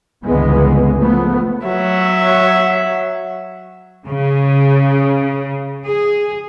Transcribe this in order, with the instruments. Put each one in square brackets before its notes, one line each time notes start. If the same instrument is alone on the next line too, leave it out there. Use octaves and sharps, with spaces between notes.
[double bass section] G1 C#2 C#3 E3 G#3 B3
F3 A3 B3
[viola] F#3 E5
[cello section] C#3
G#4